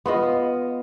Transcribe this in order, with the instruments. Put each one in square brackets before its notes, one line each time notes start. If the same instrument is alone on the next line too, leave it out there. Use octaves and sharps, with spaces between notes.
[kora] B3 F4 D#5